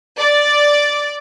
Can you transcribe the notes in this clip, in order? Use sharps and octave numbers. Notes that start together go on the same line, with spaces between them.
D5